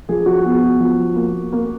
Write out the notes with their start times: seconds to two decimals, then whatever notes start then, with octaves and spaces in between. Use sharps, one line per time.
0.09 F3 G#4
0.26 F#4
0.45 B3
0.80 F3
1.16 A#3
1.53 A#3